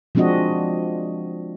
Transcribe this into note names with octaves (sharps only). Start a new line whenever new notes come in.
F3 G#3 C4 D4 F#4 D#5